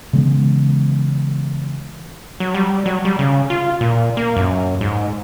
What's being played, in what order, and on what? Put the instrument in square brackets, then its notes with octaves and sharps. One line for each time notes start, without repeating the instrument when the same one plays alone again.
[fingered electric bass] C#3 E3 G#3 B3
[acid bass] F#3
G3
F#3
G3
C#3
F4
A#2
A#3
F#2
G#2